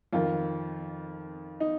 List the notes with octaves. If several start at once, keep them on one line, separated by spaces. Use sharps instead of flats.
F2 D#3 F4
D#4